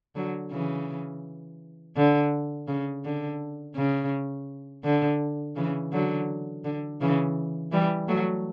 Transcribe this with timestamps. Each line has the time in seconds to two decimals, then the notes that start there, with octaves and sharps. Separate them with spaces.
0.15 D3 F#3
0.51 C#3 E3
1.97 D3
2.68 C#3
3.05 D3
3.76 C#3
4.84 D3
5.56 C#3 E3
5.93 D3 F#3
6.65 D3
7.01 C#3 E3
7.72 E3 G3
8.08 F#3 A3